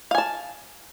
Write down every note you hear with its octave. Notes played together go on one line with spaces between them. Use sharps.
F5 G#5 A5